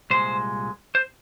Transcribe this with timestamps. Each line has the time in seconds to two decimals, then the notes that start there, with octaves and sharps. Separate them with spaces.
0.10 C2 A#2 G#3 C5
0.95 C5